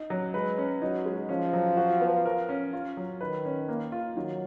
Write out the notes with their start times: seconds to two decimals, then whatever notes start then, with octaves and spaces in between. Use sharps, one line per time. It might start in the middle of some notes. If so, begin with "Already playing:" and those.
Already playing: D#4
0.10 F#3
0.34 G#3 B4
0.58 C#4
0.82 F#3 D#4
1.06 G#3
1.29 F3 C#4
1.53 F#3
1.77 F#4
2.01 B3
2.25 A#4
2.49 C#4
2.73 F4
2.97 F#3
3.21 D#3 B4
3.45 C#4
3.68 A#3
3.92 F4
4.16 D#3 F#3